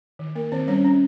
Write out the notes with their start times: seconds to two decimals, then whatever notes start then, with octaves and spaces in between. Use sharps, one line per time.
0.19 D#3
0.35 A#3 A#4
0.52 D#3 C4 C5
0.68 G3 C#4 C#5
0.84 C#4